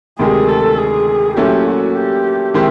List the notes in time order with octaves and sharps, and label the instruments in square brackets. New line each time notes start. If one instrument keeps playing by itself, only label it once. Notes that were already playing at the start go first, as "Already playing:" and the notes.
[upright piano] D2 C3 D#3 G#3 [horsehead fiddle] G#4
[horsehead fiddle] A4
G#4
[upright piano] A#2 F#3 A3 C#4 E4 [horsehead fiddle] G4
[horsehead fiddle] F#4
G4
[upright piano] D#3 G#3 C4 E4 G4